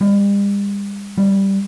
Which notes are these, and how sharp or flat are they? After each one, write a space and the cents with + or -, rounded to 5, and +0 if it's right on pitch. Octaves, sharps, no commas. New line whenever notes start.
G3 +40
G3 -5